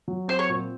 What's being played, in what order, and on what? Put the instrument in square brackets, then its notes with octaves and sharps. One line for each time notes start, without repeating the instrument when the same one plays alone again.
[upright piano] F#3
[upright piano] C4 [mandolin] C5
[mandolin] C#5
[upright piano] A#2